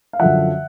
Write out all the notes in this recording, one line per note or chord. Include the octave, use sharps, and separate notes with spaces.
F5
F#2 D3 F3 E5 F#5